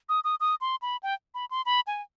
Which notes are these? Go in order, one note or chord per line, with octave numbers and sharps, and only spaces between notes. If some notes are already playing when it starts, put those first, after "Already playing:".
D#6
D#6
D#6
C6
B5
G5
B5
C6
B5
G#5